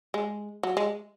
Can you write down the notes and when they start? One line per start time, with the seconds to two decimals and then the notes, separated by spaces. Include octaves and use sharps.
0.14 G#3
0.63 F#3
0.77 G#3